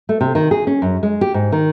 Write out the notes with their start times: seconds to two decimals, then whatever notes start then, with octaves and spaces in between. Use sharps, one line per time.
0.09 A3
0.21 C3
0.35 D#3
0.51 G#4
0.67 C#4
0.82 F#2
1.03 G#3
1.21 G4
1.34 G#2
1.52 D#3